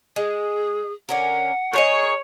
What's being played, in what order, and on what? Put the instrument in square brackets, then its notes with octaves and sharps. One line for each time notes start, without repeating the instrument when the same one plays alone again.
[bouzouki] G#3 [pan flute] G#4
[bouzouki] D3 C#4 A#4 [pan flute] F#5
[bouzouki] D#4 G#4 A#4 [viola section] C#5